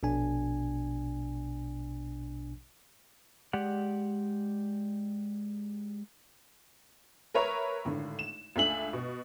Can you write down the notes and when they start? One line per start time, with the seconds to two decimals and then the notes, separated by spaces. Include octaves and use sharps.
0.03 A#1 B2 D4 G#5
3.53 G#3 G4 D5 F#5
7.34 A#4 B4 C#5 E5 A#5
7.85 G#1 A2 D3
8.19 E7
8.56 C#2 A3 D4 E5 G#5 F#7
8.93 B2